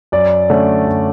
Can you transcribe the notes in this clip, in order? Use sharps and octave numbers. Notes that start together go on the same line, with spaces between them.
F#2 D5
D3 A3 C#4
F#2